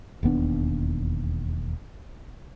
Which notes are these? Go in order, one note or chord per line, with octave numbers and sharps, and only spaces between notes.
E1 D#2 B3 D4